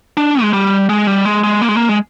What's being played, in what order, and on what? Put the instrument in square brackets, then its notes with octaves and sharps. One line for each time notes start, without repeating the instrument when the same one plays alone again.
[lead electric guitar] D4
G#3
G3
G#3
G3
G#3
G#3
A#3
G#3
A#3
G#3